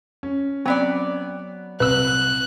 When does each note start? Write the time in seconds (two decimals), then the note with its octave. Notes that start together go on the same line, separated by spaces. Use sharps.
0.23 C#4
0.66 F#3 B3 C4 D5
1.80 C2 B4 E6 F#6